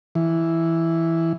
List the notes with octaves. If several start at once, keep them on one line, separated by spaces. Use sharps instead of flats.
E3